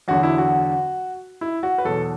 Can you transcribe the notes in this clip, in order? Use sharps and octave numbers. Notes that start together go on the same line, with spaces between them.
E2 D3 F#3 F#4
E4
F#4
E4
F#4
B4
E2 B2 F#3 A4